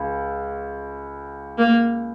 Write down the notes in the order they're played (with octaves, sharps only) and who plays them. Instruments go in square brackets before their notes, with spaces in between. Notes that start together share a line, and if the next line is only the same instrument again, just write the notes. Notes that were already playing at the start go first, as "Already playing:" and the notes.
Already playing: [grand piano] C#2
[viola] A#3